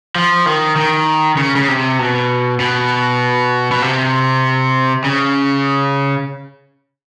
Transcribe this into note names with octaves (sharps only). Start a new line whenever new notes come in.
F3
D#3
D#3
C#3
C#3
C3
B2
B2
B2
C3
C#3